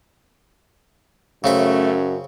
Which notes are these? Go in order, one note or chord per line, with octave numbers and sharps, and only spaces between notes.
F#2 C#3 A3 C4 C#4 E5